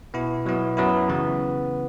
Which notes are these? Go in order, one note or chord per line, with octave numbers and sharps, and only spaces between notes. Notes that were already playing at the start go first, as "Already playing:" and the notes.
B2 B3 E4
B2 F#3 B3 E4
F#2 F#3 B3 E4
C#3 E3 B3